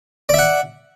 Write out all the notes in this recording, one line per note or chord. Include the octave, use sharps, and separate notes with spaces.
D5 E5 F#5